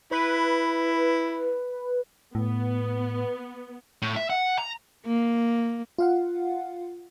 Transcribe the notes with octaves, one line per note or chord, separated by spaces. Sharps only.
E4 B4
A2 B3
A2
E5
F#5
A#5
A#3
F4 F5 F#5